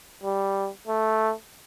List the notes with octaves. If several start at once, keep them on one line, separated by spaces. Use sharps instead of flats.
G3
A3